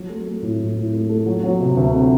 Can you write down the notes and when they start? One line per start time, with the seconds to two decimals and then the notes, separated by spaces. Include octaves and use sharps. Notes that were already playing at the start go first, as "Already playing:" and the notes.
Already playing: F#3
0.09 A3
0.26 A3
0.42 A2
0.59 A2
0.76 A2
0.93 A3
1.09 A3
1.26 F#3
1.43 F#3
1.61 C3
1.76 D2
1.94 C3